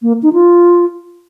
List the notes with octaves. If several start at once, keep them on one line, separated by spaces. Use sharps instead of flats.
A#3
D#4
F4